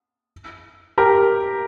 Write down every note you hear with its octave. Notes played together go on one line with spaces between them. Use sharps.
G4 A#4